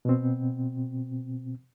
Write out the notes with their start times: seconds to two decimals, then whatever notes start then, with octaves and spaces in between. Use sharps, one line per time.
0.05 B2 C4